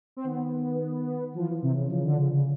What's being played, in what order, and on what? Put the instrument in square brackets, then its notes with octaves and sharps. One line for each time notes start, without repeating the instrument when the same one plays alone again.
[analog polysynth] C4
[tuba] D#3 [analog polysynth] B3
[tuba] E3 [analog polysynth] F3
[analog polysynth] C3
C#3
[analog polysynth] C#3 [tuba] F3
[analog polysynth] D3
C#3
C#3